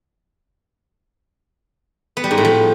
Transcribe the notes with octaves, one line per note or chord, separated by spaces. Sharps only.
B3
G3
G#2
A2
F3